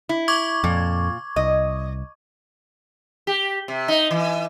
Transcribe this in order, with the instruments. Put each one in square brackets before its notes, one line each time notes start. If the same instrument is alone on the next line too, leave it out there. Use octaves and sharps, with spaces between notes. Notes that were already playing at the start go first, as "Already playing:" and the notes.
[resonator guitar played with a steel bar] E4
[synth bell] C#6 D6 G#6
[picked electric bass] F2 [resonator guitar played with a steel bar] A#2
[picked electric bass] C2 [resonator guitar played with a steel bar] D#5
[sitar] G4
C3
D#4
E3